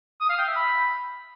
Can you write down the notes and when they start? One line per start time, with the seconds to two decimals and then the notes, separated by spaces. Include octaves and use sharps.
0.21 D#6
0.30 F5
0.38 G5
0.47 E5
0.56 B5